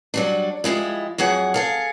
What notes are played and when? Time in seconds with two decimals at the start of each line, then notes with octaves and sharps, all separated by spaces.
0.14 F#3 G3 D4
0.64 F3 G3 G#3 E4
1.18 F2 F#3 G#4 F#5
1.54 G#4 A4 F5